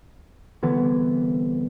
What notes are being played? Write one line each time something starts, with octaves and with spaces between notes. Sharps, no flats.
C2 D3 E3 B3